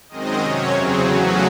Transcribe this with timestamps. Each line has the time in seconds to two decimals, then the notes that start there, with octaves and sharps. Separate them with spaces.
0.09 F#2 D#3 G#3 C4 D#5
0.40 C3 F#3 C#4 C#5
0.71 E2 C#3 F#3 C4 G#4
1.02 E2 C#3 F#3 A3 C#4 F#4